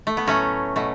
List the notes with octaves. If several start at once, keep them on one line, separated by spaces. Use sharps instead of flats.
A3
B3
A2 F#3 A3 C#4
B2 A3